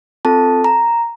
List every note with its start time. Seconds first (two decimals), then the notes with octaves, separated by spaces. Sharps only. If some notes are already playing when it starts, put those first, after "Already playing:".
0.25 C4 F4 A4 A5
0.64 A#5